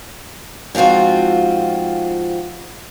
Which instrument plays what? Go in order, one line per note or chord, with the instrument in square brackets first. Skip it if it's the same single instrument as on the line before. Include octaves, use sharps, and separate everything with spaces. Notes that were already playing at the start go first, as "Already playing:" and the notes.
[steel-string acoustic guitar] G#2 F3 C4 F4 F#4